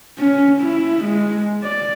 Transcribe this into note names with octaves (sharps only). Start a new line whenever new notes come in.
C#4
E4
G#3
D5